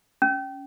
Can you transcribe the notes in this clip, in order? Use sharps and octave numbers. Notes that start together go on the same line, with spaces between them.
C#4